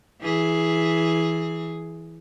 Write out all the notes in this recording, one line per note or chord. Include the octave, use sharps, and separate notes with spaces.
E3 G#4